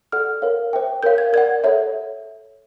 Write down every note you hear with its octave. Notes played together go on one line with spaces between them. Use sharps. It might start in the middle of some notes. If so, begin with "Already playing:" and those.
A4 D5 F#5 F6
A#4 C#5 F5
C5 E5 G5
A#4 C#5 F5 G6
G#6
A#4 D5 F#5 G#6
A4 C#5 E5